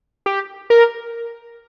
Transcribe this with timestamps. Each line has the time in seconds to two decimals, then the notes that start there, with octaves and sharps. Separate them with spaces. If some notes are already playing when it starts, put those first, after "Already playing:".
0.26 G4
0.70 A#4